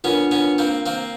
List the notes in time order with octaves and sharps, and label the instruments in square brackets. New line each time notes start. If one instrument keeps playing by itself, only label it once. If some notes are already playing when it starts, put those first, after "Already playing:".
[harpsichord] B3 C#4 [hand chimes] D4 F4 A#4
[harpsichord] B3 C#4
A#3 C4
A#3 C4